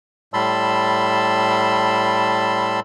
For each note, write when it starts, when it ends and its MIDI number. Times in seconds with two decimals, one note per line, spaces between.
0.34 2.80 45
0.34 2.80 55
0.34 2.80 81
0.34 2.80 83
0.34 2.80 84
0.34 2.80 88